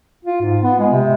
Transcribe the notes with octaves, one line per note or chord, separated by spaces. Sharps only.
F4
G#2
B3
G#3
C3